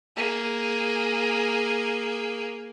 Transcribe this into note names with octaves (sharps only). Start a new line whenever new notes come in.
A#3 G#4